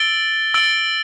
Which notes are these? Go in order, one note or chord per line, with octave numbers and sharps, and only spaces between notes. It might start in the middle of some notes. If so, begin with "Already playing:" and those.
Already playing: E6 A6 D7 G7
E6 A6 D7 G7